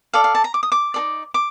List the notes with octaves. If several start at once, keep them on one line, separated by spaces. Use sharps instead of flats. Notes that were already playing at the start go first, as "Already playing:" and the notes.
A4 D5 F5
F5
A5
A#5
D6
D#6
D6
D#4 A4 D5
D6